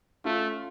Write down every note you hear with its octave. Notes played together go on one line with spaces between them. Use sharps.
A3 C#4 F4